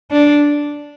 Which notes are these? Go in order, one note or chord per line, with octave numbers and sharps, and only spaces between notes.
D4